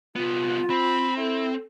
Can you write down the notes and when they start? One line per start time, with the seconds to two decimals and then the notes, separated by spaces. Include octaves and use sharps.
0.16 C2 B3 F4
0.70 C4 B5
1.17 E4 A4